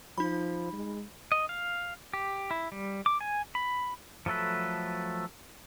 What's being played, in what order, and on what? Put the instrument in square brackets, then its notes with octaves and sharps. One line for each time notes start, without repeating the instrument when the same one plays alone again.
[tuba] F3 [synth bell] D#4 B5
[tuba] G#3
[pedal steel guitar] D#5
F5
G4
E4
G3
D6
G#5
B5
F3 F#3 A3 A4 B4